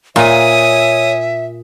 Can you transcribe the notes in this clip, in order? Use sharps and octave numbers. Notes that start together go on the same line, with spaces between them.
A#2 C#5 E5 G#5 D#6